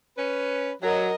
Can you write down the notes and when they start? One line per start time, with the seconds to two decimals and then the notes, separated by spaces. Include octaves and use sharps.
0.17 C#4 B4
0.82 F#3 A#4 D#5